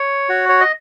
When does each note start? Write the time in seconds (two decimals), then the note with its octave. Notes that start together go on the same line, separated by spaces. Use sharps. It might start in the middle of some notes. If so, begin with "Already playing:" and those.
Already playing: C#5
0.29 F#4
0.49 C#5
0.61 D#5